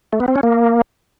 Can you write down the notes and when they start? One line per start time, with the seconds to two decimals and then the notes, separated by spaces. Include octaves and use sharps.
0.13 A3
0.20 B3
0.28 C4
0.36 C#4
0.43 A#3